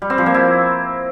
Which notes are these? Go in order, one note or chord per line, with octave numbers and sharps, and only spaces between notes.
G3
C4
F3
A#3
E4